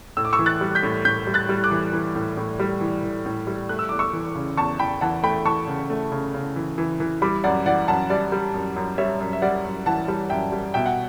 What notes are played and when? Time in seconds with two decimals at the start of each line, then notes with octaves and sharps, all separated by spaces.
0.17 A2 E6
0.25 D6
0.33 C#6 E6
0.39 E3
0.46 F#6 A6
0.61 G3
0.75 G6 B6
0.83 A2
1.05 A2 G6 B6
1.27 G3
1.34 F#6 A6
1.49 G3
1.64 D6 F#6
1.71 E3
1.93 E3
2.15 A2
2.37 A2
2.59 G3
2.81 E3
3.04 E3
3.26 A2
3.47 G3
3.69 A3 F#6
3.79 E6
3.89 E2 D6
3.99 C#6 E6
4.13 E3
4.35 C#3
4.57 E2 A5 C#6
4.79 E2 G5 B5
5.01 E3 F#5 A5
5.23 A3 G5 B5
5.45 E3 A5 C#6
5.67 C#3
5.90 A3
6.12 C#3
6.34 C#3
6.56 E3
6.78 E3
7.00 E3
7.22 G3 B5 D6
7.44 F#2 D5 F#5
7.66 E3 D5 F#5
7.88 F#2 F#5 A5
8.10 G3 D5
8.32 G3
8.54 F#2
8.76 F#2
8.98 G3 C#5 E5
9.20 F#2
9.33 E5
9.42 G3 D5 F#5
9.64 F#2
9.86 E3 F#5 A5
10.08 G3
10.30 F#2 E5 G5
10.52 G3
10.74 B2 E5 G5
10.86 F#5